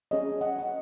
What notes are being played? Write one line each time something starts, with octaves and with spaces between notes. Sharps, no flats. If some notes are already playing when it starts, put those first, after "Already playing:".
C#4 G#4 C#5 D#5
D#5 F#5
F#5